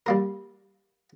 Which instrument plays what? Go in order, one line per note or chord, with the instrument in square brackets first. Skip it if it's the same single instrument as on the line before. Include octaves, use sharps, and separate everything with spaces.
[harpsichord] G3 A#3 A#4